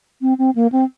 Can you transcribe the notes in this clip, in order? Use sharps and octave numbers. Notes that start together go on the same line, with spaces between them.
C4
C4
A#3
C4